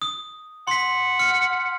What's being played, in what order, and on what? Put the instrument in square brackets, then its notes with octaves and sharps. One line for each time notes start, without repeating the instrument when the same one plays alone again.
[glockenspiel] D#6
[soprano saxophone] F#5 [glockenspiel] C6 B6
[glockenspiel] F6 C#7